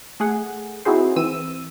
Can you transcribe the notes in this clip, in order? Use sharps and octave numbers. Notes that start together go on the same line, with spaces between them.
A3 G#4 F#5
C4 D#4 E4 F#4 G#4 C5
E3 C4 E6 D#7